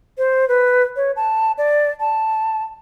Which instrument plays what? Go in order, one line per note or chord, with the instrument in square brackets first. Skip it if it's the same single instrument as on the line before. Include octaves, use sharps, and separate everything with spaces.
[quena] C5
B4
C#5
A5
D5
A5